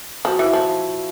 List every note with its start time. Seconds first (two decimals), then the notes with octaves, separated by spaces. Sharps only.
0.25 F3 F#4
0.39 E3 E4
0.53 F3